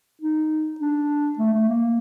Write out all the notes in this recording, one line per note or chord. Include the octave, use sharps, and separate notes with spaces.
D#4
D4
A3
A3
A#3